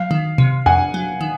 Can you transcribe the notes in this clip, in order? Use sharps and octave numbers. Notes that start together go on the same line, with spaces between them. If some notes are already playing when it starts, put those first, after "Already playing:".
Already playing: F#3 F5
D#3
C3
F2 F#5 G#5
F#3
D#3